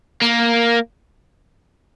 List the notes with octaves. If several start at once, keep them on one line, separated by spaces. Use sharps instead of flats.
A#3